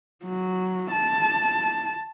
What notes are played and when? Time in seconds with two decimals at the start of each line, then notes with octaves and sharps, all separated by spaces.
0.24 F#3
0.91 A5